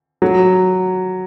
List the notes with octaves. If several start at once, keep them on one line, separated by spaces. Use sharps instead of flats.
F#3